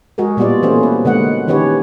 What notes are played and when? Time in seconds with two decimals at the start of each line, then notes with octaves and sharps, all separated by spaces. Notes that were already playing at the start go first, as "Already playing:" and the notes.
0.18 G#3 F#4 G#4 A#4
0.37 A#2 G3 A#3 B3 F4 D5
0.63 E3 A3 B3 C#4 G#4 C5
0.83 B4
1.05 D3 G#3 A#3 F#5
1.48 D#3 E3 C#4 G4 B4 C#5